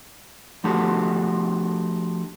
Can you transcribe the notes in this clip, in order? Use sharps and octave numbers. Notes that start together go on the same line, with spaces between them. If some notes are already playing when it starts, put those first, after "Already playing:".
F3 A3 D4 F#4 G4 A4